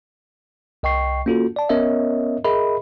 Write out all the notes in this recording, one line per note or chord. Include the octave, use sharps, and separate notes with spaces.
C2 D#5 G5 C#6 C7
A#3 C#4 F4 F#4 A4
D5 A5
B3 C#4 A#4 C#5 D#5 E5
G#4 A#4 D#5 E5 B5